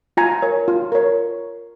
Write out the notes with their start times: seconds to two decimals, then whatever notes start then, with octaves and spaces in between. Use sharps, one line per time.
0.17 F4 G#5 A#5
0.42 A#4 C#5
0.68 F4
0.92 A#4 C#5